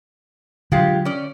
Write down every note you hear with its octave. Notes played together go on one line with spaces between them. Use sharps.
D3 F#3 G#3 F4 G4
C#4 D5